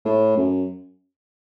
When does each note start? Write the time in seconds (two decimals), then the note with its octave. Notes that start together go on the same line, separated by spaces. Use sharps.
0.05 A2
0.37 F#2